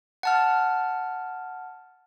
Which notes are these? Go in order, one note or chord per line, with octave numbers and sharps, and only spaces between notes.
F#5 A5 F6